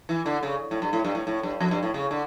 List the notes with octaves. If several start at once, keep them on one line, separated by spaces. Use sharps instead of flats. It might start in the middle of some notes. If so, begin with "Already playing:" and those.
E3
D3
C#3
A2
G2
A2
G2
A2
A2
G2
F2
G2
A2
C#3
D3